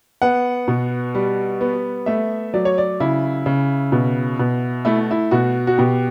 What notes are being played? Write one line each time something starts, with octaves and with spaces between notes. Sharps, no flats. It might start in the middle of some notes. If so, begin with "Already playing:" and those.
B3 F#5
B2
G3
B3
A3 E5
F#3 D5
C#5
D5
C#3 E4
C#3
B2
B2
A3 E4
E4
B2 F#4
F#4
B2 G4